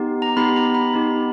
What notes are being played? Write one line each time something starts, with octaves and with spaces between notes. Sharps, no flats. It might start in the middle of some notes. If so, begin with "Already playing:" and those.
Already playing: B3 D#4 G4
A#5
B3 D#4 G4 B5
A#5
B5
B3 D#4 G4